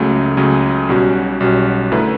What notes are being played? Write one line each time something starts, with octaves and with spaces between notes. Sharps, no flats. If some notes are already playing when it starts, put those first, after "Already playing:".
Already playing: C#2 C#3 F#3 A3 C#4
C#2 C#3 F#3 A3 C#4
B1 B2 G3 C#4 F#4
B1 B2 G3 C#4 F#4
F#2 D3 A3 E4 B4